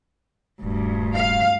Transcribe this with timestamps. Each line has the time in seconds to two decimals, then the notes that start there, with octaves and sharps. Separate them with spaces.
0.62 D#1 D2 G2
1.16 F5